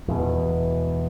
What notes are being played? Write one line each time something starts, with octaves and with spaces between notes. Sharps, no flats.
E2 B2